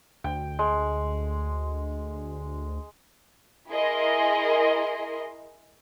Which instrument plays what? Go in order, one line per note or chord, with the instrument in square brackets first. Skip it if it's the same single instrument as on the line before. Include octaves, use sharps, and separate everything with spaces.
[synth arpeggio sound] D2 [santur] G5
[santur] G#3
[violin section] E4 G#4 A#4 D#5 C6